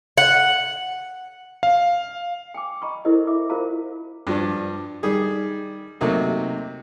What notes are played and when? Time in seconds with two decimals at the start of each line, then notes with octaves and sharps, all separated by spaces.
0.18 F#5
1.63 F5
2.54 G5 G#5 D6
2.82 D#5 A#5 B5 C#6
3.05 E4 A4 A#4 C5 D#5 A#5
3.27 E5 D6
3.50 F4 A#4 C5 F5 A#5
4.27 G2 F3 D4
5.03 D#3 G3 G#4
6.01 C3 F#3 A3 A#3 D#4